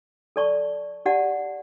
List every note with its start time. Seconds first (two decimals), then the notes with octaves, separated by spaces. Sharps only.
0.36 A4 D5 A5 C#6
1.06 G4 D5 F#5 A5